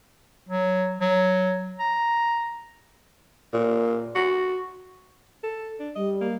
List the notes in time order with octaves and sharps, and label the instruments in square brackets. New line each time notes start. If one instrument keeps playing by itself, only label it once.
[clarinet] F#3
F#3
A#5
[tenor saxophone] A#2
F#4
[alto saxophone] A4
D4
[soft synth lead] G3 [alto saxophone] D#5
[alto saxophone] A#3